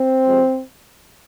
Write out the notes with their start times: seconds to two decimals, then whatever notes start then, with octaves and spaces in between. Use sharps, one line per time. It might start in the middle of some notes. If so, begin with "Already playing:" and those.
Already playing: C4
0.26 C3 F3 G#3